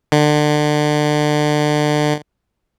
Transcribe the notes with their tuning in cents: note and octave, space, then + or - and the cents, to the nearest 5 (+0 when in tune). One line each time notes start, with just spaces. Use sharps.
D3 +30